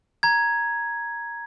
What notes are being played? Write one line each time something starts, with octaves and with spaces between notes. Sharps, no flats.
A#5 G#6